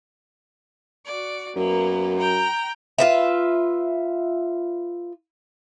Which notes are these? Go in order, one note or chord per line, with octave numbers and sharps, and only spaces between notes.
F#4 D5
F#2 A#3 B3
G5 A#5
F4 B4 E5